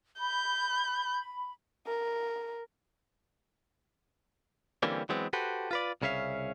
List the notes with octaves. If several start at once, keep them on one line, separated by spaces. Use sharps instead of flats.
B5 G6
A#4
D3 E3 G3 A#3 C4 C#4
E3 F#3 G#3 B3 C4
F#4 G4 A4 B4 C5
F4 B4 D5
C2 C#3 C#4 E5 F5